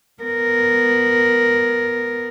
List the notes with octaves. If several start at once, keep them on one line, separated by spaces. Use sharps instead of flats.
B3 A#4